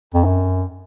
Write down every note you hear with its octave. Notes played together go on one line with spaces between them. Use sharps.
F2
F#2